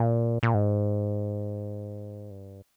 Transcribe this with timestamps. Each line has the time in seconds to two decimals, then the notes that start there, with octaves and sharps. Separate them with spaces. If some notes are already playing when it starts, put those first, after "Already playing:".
Already playing: A#2
0.43 A#2
0.54 G#2
2.31 G2